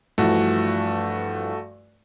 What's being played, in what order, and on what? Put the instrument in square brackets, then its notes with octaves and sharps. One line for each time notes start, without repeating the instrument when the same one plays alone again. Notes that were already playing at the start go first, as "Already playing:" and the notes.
[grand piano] G2 E3 F3 [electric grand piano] A3 F#4